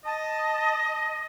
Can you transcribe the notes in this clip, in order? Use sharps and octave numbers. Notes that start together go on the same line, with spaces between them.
D#5 A5